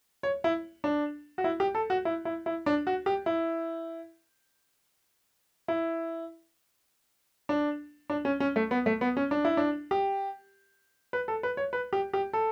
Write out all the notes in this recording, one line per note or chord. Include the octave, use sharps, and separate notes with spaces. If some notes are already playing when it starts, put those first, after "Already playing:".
C#5
E4
D4
F#4
E4
G4
A4
F#4
E4
E4
E4
D4
F#4
G4
E4
E4
D4
D4
C#4
C#4
A3
B3
A3
B3
C#4
D4
E4
D4
G4
B4
A4
B4
C#5
B4
G4
G4
A4